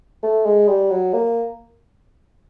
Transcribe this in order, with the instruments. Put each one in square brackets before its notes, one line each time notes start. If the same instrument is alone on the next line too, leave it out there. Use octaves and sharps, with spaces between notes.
[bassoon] A3
G#3
G3
F#3
A#3